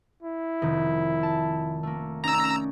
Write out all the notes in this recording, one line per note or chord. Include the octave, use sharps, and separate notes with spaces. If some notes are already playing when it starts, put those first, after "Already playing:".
E4
F1 D#3
A5
A3 A#3
C#4 D#4 D5 A#5 E6